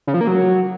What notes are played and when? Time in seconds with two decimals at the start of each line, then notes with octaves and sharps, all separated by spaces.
0.07 C#3
0.14 F3
0.21 A#3
0.27 F#3